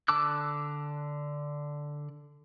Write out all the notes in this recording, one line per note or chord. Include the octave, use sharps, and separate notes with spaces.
D3 A5 D6 E6 F#6